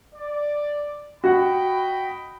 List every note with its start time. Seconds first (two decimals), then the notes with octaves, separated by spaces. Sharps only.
0.15 D5
1.24 F#4 D#5 F#5 G5 B5